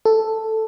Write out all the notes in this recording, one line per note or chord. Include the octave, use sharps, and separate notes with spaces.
A4